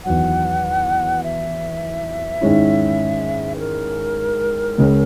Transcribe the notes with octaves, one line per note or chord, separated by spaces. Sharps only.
E2 D#3 F#3 F#5
E5
G#2 D#3 G#3 C#4 E4
B4
A#4
C#2 C#3 G#3 C#4